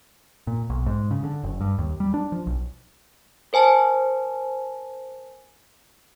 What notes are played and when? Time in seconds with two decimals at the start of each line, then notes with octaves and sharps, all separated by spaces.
0.47 A#2
0.70 B1
0.86 G#2
1.11 C#3
1.24 D3
1.43 F#1
1.60 G2
1.78 D#2
2.00 G3
2.14 D4
2.32 F3
2.47 B1
3.53 A#4 C5 G#5 A5